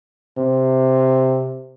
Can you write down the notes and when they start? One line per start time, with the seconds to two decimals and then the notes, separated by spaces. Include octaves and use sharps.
0.38 C3